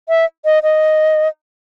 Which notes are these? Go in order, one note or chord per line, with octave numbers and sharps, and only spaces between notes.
E5
D#5
D#5